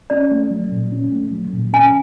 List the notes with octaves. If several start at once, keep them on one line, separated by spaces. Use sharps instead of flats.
C#4 D5
A3
F#3
A#2
C#4
A3
F#3
A#2
C#4 G#5